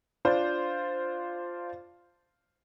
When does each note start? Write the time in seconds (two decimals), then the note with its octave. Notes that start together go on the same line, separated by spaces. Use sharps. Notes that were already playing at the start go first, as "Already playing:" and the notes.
0.25 D4 F4 C5